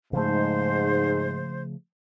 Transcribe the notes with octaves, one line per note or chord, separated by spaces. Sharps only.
G#2 C#3 F3 A3 C5